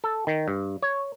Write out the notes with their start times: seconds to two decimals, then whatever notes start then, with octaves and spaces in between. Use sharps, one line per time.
0.04 A4
0.27 D#3
0.48 G2
0.82 C#5